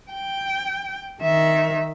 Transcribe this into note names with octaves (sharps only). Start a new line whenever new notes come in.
G5
D#3 E5